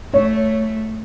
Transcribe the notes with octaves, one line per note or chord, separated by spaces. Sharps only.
A3 C#5